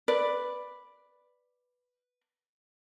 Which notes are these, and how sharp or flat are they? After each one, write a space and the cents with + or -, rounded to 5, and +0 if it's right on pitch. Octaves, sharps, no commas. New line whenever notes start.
B4 +0 D5 +0